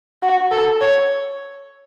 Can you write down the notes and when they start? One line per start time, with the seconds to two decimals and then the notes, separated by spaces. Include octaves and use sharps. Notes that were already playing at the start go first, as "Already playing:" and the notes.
0.22 F#4
0.51 A4
0.81 C#5